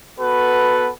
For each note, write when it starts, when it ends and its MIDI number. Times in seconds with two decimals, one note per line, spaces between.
0.19 0.91 59
0.19 0.91 66
0.19 0.91 69
0.19 0.91 71